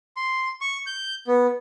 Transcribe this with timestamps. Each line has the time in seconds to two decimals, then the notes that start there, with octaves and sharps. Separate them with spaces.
0.16 C6
0.61 C#6
0.87 G6
1.27 B3